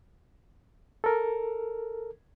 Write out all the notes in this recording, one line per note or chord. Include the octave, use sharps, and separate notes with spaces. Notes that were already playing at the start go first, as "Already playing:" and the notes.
A4 A#4